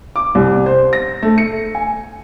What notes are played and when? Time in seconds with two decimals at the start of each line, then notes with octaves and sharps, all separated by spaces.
0.16 D6
0.35 C2
0.66 C5
0.93 A#6
1.23 A3
1.38 C#7
1.75 G#5